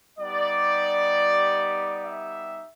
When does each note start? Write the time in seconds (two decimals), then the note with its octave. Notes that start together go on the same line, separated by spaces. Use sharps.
0.18 G3 B3 D#4 G4 D5
2.04 E5